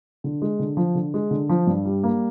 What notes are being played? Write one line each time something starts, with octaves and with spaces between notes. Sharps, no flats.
D3
G#3
D3
F3
D3
G#3
D3
F3
G2
G3
A#3